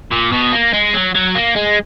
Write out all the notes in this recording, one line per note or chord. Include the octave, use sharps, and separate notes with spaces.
A#2
B2
A#3
G#3
F#3
F#3
A#3
G#3